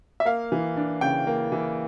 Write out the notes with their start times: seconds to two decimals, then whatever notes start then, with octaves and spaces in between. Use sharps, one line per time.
0.20 E5
0.25 A#3 F5
0.52 E3
0.77 D4
1.01 C#3 G5
1.27 A#3
1.52 E3